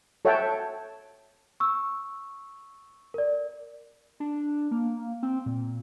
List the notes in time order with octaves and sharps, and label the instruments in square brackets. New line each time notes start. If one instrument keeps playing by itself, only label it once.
[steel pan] A4 C#5 E5 F#5 G5 A5
[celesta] C#6 E6
A#4 D5
[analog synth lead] D4
A#3
C4
A#2